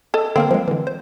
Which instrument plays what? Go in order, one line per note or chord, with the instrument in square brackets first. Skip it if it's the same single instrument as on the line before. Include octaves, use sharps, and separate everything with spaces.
[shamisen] A4 D#5
[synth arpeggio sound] D3 A#3 A#4 [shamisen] C4
[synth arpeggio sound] F3 G#3
D3 E3
C5